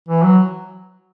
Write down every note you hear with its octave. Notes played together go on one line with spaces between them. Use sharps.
E3
F#3